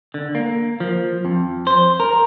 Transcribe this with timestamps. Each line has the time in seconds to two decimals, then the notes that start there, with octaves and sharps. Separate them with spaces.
0.14 D3
0.35 A#3
0.80 F3
1.25 F2
1.67 C5
2.00 A#4